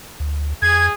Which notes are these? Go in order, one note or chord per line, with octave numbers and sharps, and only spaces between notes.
D2
F2 G#4 G#6